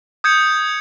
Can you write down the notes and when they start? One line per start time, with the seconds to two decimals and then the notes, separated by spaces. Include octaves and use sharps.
0.24 D#6 G6 G#6 C#7